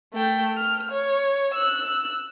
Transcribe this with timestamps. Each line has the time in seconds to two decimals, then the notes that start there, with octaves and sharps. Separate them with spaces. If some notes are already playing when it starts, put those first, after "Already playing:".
0.13 A3 G5
0.57 F6
0.91 C#5
1.54 E6 F#6